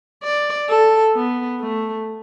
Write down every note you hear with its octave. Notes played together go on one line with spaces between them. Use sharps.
D5
A4
B3
A3